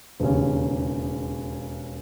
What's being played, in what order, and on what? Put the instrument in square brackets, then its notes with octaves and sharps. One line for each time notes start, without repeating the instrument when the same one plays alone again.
[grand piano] E1 D#2 C#3